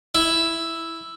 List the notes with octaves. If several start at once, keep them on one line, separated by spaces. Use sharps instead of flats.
E4